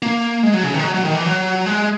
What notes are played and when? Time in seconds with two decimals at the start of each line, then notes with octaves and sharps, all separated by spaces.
0.02 A#3
0.43 G#3
0.54 F#3
0.63 C#3
0.74 D#3
0.79 G#3
0.84 F#3
0.94 F#3
1.05 D#3
1.15 E3
1.26 F#3
1.66 G#3